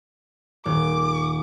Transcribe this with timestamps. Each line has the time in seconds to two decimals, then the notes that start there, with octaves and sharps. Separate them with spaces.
0.66 D#1 D6